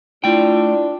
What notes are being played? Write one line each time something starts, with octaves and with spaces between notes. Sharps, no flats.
A3 D4 E4 F4 G5